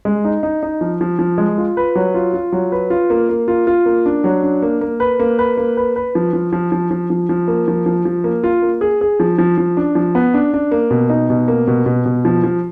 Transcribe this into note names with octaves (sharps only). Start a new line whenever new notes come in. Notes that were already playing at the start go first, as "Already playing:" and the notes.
G#3
D#4
D#4
D#4
F3
F3
F3
G#3
F4
B4
F#3
F4
F4
F#3
B4
F4
A#3
A#3
F4
F4
A#3
D4
F#3
D4
A#3
A#3
B4
A#3
B4
A#3
B4
B4
F3
F3
F3
F3
F3
F3
F3
A#3
F3
F3
F3
A#3
F4
A#3
G#4
G#4
F3
F3
F3
D4
F3
B3
D4
D4
A#3
B2
D#4
B2
A#3
B2
B2
B2
F3
F3